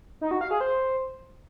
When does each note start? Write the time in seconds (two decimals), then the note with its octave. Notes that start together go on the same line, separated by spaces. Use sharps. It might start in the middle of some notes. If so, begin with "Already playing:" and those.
0.21 D#4
0.31 F#4
0.41 F5
0.51 G#4
0.60 C5